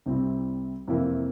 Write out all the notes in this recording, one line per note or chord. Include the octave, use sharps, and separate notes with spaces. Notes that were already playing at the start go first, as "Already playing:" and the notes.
C2 C3 G3 C4 E4
F2 C3 E3 A#3 E4